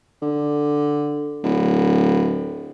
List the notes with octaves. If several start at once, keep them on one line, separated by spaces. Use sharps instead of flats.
D3
D1